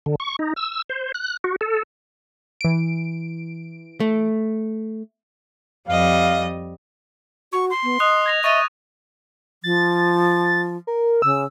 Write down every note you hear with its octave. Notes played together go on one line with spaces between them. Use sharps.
D3
C#6
D#4
E6
C5
F#6
F#4
A4
E3 D7
A3
F2 G3 D#5 F5
F#4 C#6
C6
B3
D#5 D#6 F#6
G#6 A#6 F7
D#5 E5 C#6 A6 D#7
F3 A6
A#4
C#3 E6